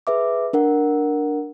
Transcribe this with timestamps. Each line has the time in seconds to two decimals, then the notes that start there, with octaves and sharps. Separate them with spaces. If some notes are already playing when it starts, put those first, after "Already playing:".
0.07 G#4 B4 E5 D6
0.53 D4 A#4 F#5